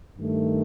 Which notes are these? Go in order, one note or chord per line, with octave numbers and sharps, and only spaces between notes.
G2 D#3 A3